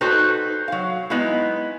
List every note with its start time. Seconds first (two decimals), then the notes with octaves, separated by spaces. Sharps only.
0.01 D#4 F#4 A4 B4 C5
0.68 F#3 F5
1.10 G#3 B3 D#4 E4